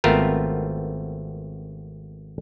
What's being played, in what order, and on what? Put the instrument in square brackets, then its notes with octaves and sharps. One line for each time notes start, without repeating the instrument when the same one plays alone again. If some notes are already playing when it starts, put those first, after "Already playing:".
[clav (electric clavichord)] G#1 A3 B3 C4 F4 A#4